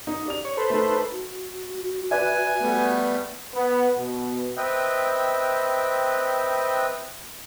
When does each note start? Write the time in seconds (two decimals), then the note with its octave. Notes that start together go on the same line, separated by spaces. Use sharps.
0.07 D#4
0.26 G4 D5 F7
0.45 C#5
0.57 A4 B4 C5
0.70 A3 D#4
1.12 F#4
2.11 B4 D5 E5 G#5
2.61 G3 A3 B3
3.54 B3
3.97 B2
4.56 C4 B4 D#5 E5 G5